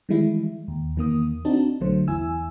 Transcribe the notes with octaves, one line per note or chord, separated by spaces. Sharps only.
D#3 E3 G3 G#3 E4
D#2
E2 D#3 A#3 D#6
C4 D4 D#4 F#4 A5
A#1 D3 F#3 A3 C5
E2 E4 G#5 E6